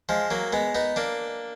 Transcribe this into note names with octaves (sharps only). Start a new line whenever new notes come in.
F3 G#3
F#3 A#3
G#3 B3
B3 D#4
A#3 D4